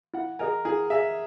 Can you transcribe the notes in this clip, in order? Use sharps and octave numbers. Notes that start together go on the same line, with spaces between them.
E4 F#5
G#4 A#4 D#5 G#5
E4 G#4
G#4 D#5 E5 G#5